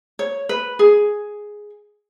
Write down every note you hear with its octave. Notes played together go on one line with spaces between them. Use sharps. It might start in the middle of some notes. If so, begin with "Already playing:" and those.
C#5
B4
G#4